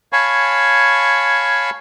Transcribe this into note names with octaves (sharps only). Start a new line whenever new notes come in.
C#5 F5 G#5 A5 B5 C#6